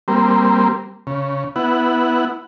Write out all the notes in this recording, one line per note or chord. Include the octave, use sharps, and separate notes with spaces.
G3 A#3 C4
C#3
B3 E4 F#5